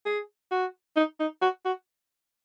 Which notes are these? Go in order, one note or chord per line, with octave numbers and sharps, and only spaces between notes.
G#4
F#4
D#4
D#4
F#4
F#4